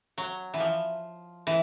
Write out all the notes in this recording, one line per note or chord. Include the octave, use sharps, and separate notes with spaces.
F#3
E3
F3
E3